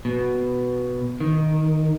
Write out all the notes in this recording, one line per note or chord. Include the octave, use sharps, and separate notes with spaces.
B2
D#3